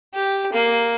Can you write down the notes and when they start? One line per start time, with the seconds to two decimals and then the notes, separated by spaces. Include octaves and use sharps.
0.14 G4
0.53 A#3